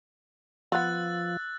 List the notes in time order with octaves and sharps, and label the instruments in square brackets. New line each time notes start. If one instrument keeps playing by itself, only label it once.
[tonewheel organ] F3 [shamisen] B3 F4 [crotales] E6 F#6 A6